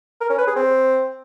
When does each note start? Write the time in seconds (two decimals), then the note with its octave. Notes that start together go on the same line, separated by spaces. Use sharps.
0.21 A#4
0.30 C#4
0.38 B4
0.47 G#4
0.56 C4